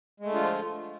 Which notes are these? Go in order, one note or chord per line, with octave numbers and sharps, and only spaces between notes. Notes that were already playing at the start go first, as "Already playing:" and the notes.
D3 F3 G#3 A3 F4